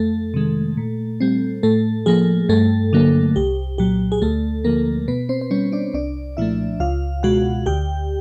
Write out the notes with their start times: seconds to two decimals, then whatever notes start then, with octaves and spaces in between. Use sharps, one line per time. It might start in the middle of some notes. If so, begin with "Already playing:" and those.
Already playing: F2 A3 A4
0.34 C3 D#3 G#3
0.77 A#2
1.20 G3 C4
1.63 A2 A3 A4
2.06 F3 A#3 G#4
2.49 G2 A3 A4
2.93 D3 F#3 A#3
3.36 C2 G4
3.78 A#2 F#3 G4
4.12 G#4
4.22 D2 A3 A4
4.64 D3 F3 A#3 A#4
5.08 B2 B3 B4
5.29 C4 C5
5.41 C5
5.51 G3 B3 C#4 C#5
5.72 D4 D5
5.94 C2 D4 D5
6.37 A#2 F3 A3 E4 E5
6.80 C#2 F4 F5
7.23 B2 G#3 F#4 F#5
7.66 D2 G4 G5